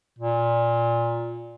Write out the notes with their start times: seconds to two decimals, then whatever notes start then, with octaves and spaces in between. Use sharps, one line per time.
0.19 A#2